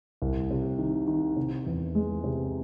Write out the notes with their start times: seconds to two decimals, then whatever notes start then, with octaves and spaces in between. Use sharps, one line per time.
0.22 C2
0.51 C3
0.78 D#3
1.07 D#3
1.36 C3
1.67 E2
1.95 G#3
2.24 C3